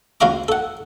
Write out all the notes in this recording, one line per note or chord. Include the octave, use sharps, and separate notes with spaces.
C#2 F4 F#4 F5 A#5 D6
A4 F#5